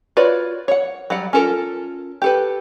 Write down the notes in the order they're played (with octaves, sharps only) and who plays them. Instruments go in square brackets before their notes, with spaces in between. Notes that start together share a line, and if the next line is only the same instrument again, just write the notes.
[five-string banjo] F4 F#4 B4 C#5 D5
C#5 F#5
F#3 G3 F#5
C#4 F4 A4 A#4
G4 A4 B4